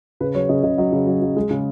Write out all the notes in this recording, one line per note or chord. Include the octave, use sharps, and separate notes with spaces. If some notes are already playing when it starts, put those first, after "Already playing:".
C#3 B4
F#3 C#5
C#3 D#5
C#3 D#5
F#3 D#5
C#3
F#3
F#3
G#3
C#3